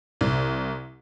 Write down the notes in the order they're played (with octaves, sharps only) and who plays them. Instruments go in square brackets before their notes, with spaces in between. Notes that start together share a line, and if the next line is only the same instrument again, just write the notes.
[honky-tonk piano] C2